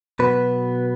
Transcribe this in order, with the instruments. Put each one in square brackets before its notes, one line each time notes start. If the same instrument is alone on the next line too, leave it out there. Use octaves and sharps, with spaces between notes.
[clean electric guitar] B2 F#3 B3 B4